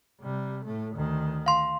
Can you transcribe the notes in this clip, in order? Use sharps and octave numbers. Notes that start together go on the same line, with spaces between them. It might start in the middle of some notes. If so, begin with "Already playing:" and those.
C3 G3
A2 A3
D2 D#3
F5 C6